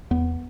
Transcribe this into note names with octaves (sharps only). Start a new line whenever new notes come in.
E2 B3